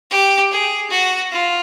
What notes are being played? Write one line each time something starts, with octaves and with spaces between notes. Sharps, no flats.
G4
G#4
F#4
F4